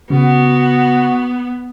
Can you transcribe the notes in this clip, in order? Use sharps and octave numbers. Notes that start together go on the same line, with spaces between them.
C#3 B3 F#4